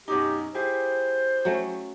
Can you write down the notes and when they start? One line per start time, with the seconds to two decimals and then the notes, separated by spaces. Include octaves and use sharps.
0.08 F#2 B2 D#4 G4
0.55 E4 G4 G#4 C5
1.45 F#3 A3 C#4